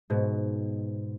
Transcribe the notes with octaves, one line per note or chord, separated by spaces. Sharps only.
G#2 B2